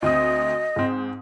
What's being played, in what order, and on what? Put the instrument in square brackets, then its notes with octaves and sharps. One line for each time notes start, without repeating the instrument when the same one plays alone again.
[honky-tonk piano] D2 C4 D#6 [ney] D#5
[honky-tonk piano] G#2 C4